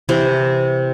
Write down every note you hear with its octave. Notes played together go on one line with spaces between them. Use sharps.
C3 E3 C4